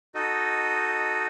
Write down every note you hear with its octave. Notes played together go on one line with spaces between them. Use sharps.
D#4 F#4 A4 D#5